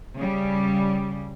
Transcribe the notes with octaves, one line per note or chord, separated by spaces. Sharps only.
C#3 G3